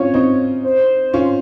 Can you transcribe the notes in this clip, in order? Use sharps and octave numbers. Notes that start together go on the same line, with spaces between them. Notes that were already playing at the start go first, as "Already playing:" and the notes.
Already playing: C4 C#4 F4 C#5
C4 D#4
C5
C#4 F4